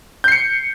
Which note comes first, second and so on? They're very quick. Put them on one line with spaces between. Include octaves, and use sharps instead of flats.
G6 C7 C#7